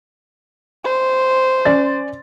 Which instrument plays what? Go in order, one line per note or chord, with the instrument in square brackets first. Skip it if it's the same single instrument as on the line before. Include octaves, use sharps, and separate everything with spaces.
[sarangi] C5
[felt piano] C#4 D5 A6